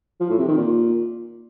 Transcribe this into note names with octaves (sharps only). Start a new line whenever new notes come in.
F3
A2
C3
D#3
A#2